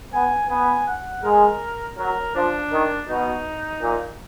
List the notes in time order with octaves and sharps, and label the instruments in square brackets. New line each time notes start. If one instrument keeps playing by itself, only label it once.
[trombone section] B3 [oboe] G#5
[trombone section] B3 [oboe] G#5
[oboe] F#5
[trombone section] G#3 [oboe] A#4
[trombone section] F#3 [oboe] A#4
[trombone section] F3 [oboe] D4
[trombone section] D#3
[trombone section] B2 [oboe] D#4
[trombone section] A#2